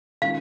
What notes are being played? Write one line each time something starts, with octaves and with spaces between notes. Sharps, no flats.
D#3 G#3 C#4 F4 F5